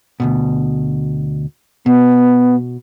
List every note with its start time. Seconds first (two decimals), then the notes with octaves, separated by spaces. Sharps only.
0.20 D2 G#2 B2
1.86 B2 B3